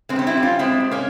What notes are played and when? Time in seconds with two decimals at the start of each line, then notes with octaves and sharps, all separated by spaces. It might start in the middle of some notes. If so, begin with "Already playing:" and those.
0.09 G#3 C4
0.16 G3 C#4
0.27 C4 E4
0.37 G3
0.42 C#4 F4
0.59 G#3 C4 E4
0.80 G2
0.91 A#3 C#4